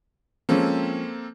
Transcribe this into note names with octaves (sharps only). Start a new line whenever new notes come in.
F3 G#3 A#3 C4 C#4 A4